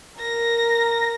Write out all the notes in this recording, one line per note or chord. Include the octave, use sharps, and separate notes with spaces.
A#4 A#6